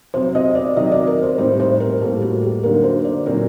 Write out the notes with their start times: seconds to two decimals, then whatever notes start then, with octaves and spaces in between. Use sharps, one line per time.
0.14 C3 F#3 C4 C5
0.35 D#5
0.55 D5
0.76 C3 D#3 F#3 D#5
0.92 D5
1.07 A#4
1.23 C5
1.38 A2 G3 C4 D#4 C5
1.60 C5
1.80 A#4
2.01 A2 G3 A#3 A4
2.22 F#4
2.43 G4
2.63 D3 F#3 A#3 D#4 A#4
2.84 C5
3.05 D5
3.26 A#2 F#3 C4 D#4 A#4